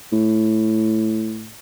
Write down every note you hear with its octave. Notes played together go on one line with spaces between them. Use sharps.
A2